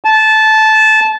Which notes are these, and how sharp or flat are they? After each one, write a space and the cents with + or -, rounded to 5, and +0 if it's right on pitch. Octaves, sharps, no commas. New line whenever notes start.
A5 -15